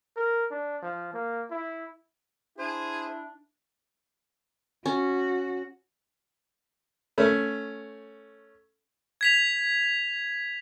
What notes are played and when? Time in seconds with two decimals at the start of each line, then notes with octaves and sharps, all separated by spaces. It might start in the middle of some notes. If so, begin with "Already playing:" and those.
0.17 A#4
0.51 D4
0.82 F3
1.13 A#3
1.51 E4
2.58 D4 E4 G#4 C5
4.86 C#4 F#4
7.18 A3 C#4
9.21 G#6 B6 F7